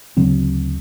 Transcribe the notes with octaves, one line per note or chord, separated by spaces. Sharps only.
D2 C#3 F#3 C4